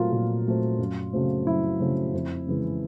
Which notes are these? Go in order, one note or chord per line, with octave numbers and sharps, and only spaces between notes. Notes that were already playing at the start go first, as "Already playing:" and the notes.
Already playing: A#2 F#3 A3 C4 F4 A#4
A#2
F#3 A3 C4
F#2
C#3 F#3 A3 C4
F#2 E4
C#3 F#3 A3 C4
F2
C#3 E3 G#3